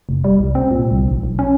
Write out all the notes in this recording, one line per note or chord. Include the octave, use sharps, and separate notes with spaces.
F1
G3
C2
C4
A#2
C2
A#1
B1
C#4